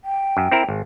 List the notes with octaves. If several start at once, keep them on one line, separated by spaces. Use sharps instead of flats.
G5
F#2
C4 E4 A#4
G#1